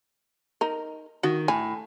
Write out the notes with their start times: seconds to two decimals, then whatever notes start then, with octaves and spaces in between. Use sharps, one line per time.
0.61 D#4 A#4
1.23 D#3 F#4
1.48 A2 G#5